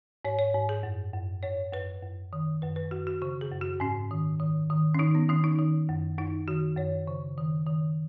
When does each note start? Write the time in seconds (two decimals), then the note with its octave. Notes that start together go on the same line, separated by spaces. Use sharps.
0.25 G#2 C#5
0.39 C#5
0.54 G#2
0.69 G#4
0.83 F#2
1.13 F#2
1.43 F#2 C#5
1.73 F#2 B4
2.03 F#2
2.33 D#3
2.62 F#2 B4
2.76 B4
2.91 F#2 F#4
3.07 F#4
3.22 C#3 F#4
3.41 G#4
3.51 F#2
3.61 F#4
3.80 G#2 C#4
4.11 D#3
4.40 D#3
4.70 D#3
4.95 C#4
4.99 D#3 D#4
5.15 B3
5.29 D#3 C#4
5.44 D#4
5.59 D#3
5.89 F#2
6.18 F#2 D#4
6.48 D#3 F#4
6.77 F#2 C#5
7.07 C#3
7.37 D#3
7.67 D#3